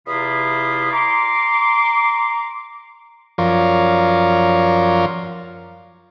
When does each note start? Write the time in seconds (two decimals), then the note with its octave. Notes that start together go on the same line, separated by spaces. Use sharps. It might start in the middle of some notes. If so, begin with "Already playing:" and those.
0.06 E2 C3 E4 F4 B5 D#6
0.92 A#5 C6 D6
3.38 F#2 F3 F4 A#4 C#5 D5